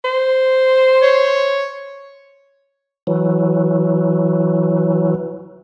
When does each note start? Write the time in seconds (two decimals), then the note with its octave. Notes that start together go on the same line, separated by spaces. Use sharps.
0.05 C5
1.02 C#5
3.07 E3 F#3